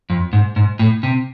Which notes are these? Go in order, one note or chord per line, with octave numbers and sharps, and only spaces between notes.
F2
G#2
G#2
A2
C3